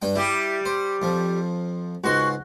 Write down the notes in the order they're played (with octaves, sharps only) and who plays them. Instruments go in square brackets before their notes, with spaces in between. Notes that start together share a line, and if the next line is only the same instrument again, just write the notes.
[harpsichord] G2 D4 G5
[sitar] G3 G4 [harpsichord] E4
[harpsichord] C5
F2 F3
[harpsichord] C#2 G#2 C6 [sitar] F#4